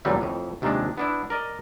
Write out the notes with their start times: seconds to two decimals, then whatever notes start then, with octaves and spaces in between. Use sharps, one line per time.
0.05 E2 A#2 C#3 F#3 G3 A3
0.21 F2 A2
0.62 D#2 C3 D#3 F3 G#3 D4
0.98 B3 D4 E4
1.30 A#4 D5 D#5